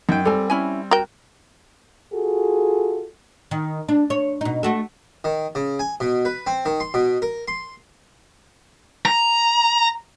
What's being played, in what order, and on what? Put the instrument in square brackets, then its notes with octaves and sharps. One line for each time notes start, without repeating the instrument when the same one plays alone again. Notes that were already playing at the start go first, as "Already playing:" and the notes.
[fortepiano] F#2 G5 [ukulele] D#4
[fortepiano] G3 C4 [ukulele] A4 G#5
[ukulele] C#4 E4 G#5
[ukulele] F#4 [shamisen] A#4 G5
[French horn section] F4 F#4 G#4 A4
[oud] D#3
D4
C#5
B2 D#4
A3 F#4 A4
[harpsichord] D#3
C#3
G#5
B2
B4
C4
D#3
C6
B2
A#4
C6
[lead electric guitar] A#5